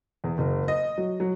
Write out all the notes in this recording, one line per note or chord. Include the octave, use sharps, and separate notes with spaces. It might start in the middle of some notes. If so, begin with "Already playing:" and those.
E2
F#1
D#5
F#3
F#3